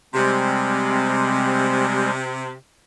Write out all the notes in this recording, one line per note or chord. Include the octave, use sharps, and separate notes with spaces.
C3 G3 G#3 C4